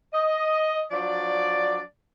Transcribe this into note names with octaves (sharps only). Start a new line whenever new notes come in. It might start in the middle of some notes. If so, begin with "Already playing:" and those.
D#5
F3 F#3 D4 D5